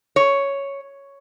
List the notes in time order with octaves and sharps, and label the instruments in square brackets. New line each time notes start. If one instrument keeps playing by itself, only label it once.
[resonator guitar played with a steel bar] C#5